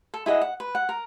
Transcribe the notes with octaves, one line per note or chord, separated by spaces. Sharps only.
A4
E4 G#4 D#5 F#5
F#5
B4
F#5
A#4